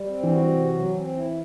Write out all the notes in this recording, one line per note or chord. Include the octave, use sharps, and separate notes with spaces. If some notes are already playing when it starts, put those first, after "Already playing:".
Already playing: G3
C4
E3
F#4
C3
F#3
C4
E4